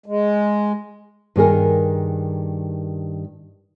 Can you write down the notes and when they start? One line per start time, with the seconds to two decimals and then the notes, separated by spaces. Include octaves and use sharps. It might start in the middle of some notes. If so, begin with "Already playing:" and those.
0.06 G#3
1.36 G2 D#3 G#4 A#4